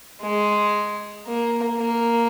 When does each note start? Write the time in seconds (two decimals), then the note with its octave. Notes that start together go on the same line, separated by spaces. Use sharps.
0.22 G#3
1.26 A#3
1.78 A#3